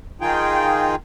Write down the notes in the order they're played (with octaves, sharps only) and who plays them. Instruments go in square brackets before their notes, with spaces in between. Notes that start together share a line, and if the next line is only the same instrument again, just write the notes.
[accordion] D#3 D#4 F4 G#4 G5